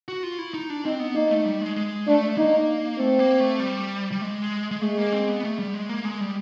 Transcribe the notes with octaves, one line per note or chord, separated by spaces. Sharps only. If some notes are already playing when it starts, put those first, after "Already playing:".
F#4
F4
E4
D#4
D4
C4 D#4
B3
A#3 D#4
A3
G3
G#3
G#3
A3 D4
A#3 D#4
A3 C4
A#3
A3
G3
G3
G#3
G#3
G#3 A3
A#3
C4
B3
A3
G3
G#3
A#3
G#3
G3